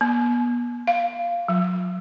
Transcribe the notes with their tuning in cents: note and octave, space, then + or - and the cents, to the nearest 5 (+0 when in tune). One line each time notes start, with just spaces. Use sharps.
B3 -35
F5 -10
F#3 -30